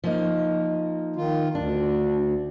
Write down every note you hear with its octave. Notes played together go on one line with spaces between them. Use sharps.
F3 A#3 D#4
D#3 F4
D2 D4